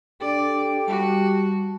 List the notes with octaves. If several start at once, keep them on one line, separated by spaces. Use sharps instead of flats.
D4 G4 A4 D5
G3 F#4 A5